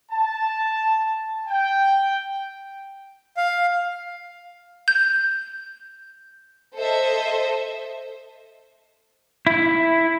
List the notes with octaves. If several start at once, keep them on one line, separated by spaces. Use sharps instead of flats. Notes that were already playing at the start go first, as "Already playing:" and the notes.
A5
G5
F5
G6
A4 C5 D#5 E5
E4